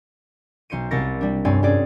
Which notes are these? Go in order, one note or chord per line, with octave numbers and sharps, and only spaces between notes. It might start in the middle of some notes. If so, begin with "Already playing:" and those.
B1 C5 C#7 D#7
C2 A#4 A6 A#6 C#7
G3 D4
F1 G2 C4 C#5 D5 G#5
C4 C#4 F#4 G#4 D5